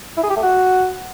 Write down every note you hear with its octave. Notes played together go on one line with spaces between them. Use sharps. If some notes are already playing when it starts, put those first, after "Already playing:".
E4
G#4
G4
A3
F#4